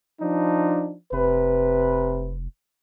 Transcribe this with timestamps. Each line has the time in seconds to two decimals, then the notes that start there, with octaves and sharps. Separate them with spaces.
0.21 F3 D4 D#4
1.12 F1 C3 B4